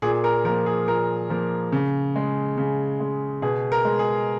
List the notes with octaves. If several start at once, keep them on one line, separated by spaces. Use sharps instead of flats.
A#2 G#4
A#4
F3 A#3 A#4
G#4
A#2 A#4
F3 A#3
C#3
G#3
C#3
G#3
B2 G#4
A#4
G#3
G#4